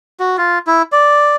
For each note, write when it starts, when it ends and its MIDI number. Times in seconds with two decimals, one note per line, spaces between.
0.20 0.37 66
0.38 0.59 65
0.67 0.82 64
0.92 1.36 74